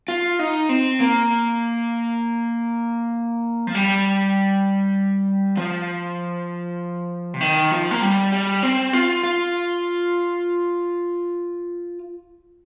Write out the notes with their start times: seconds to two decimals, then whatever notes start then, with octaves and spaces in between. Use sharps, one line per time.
0.08 F4
0.39 D#4
0.69 C4
1.00 A#3
3.67 F3
3.75 G3
5.57 F3
7.34 C3
7.41 D#3
7.72 F3
7.91 A#3
8.02 G3
8.32 G3
8.63 C4
8.93 F4
9.23 F4